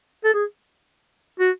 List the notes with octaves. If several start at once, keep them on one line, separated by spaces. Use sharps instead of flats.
A4
G#4
F#4